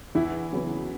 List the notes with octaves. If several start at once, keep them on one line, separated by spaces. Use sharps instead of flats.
E2 E3 E4
C#3 F#3 B3